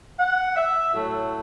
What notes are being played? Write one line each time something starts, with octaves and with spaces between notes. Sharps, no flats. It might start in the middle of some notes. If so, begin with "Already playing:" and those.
F#5
E5
A2 F#3 A3